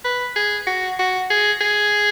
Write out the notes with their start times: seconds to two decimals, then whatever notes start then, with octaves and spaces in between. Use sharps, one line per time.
0.05 B4
0.36 G#4
0.67 F#4
0.99 F#4
1.30 G#4
1.61 G#4